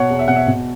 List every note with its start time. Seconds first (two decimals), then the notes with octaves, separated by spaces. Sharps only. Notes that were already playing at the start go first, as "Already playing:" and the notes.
Already playing: B2 C#5 F#5
0.10 E2
0.19 E5
0.28 B2 F#5
0.36 E5
0.47 B2